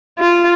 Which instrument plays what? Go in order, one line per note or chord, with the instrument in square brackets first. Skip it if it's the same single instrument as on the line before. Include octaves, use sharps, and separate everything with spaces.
[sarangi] F4